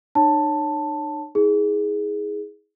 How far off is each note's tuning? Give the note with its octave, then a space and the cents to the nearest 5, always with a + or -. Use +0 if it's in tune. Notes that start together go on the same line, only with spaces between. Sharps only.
D#4 -45 C#5 +0 A5 +5
E4 -45 G#4 +0